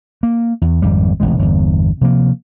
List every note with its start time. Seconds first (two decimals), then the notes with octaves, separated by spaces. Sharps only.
0.23 A#3
0.61 E2
0.82 G#1 F2 G3
1.20 E1 A1 C3 G#3
1.39 G1 E2
2.01 C3 F3 A#3